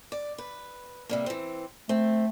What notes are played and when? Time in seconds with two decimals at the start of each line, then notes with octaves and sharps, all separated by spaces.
0.12 D5
0.38 B4
1.09 C3 G3 A#3
1.26 E3 C4
1.89 A3 C4